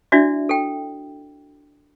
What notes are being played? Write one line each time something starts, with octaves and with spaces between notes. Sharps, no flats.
D4 E4 F#4 D5 E5
A4 G5